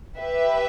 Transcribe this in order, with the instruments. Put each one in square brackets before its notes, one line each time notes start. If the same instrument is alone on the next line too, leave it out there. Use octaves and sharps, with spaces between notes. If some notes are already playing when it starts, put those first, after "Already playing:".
[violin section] G4 B4 E5